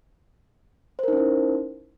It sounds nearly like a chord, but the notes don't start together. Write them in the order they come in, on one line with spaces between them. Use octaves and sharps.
C5 A#4 D#4 C#4 E4